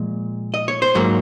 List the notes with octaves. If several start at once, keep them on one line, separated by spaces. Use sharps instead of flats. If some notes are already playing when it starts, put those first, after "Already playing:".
Already playing: A#2 F3 G#3
D#5
C#5
C5
G#2 F#3 A#3